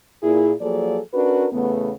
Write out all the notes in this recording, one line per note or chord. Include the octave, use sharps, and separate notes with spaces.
A#2 E4 G#4
F3 F#3 A#3 G#4 A4 D5
C#4 D4 F#4 A#4 B4
E2 C#3 A3 B3